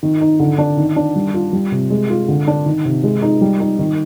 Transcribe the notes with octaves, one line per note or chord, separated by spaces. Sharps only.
D#3
D#4
D3
D4
D#3
D4
G3
F4
G3
C3
G#3
F4
D3
D4
D#3
C3
G#3
D#4
G3
D#4
D#3